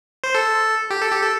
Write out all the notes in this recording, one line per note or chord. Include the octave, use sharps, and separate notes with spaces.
C5
A4
G4
A4
G4
A4